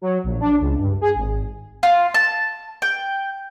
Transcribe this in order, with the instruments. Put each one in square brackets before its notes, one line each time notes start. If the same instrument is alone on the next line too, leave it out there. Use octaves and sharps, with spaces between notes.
[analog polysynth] F#3
A#1
D4
C#2
G2
G#4
G#1
[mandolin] F4
A5
G5